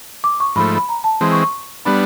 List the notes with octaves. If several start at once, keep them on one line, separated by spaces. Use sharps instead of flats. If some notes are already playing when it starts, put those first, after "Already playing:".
D6
C#6
G#2 F3 A3 B5
B5
A#5
A5
E3 G#3 C4 C6
C#6
C#6
G3 B3 D4 B5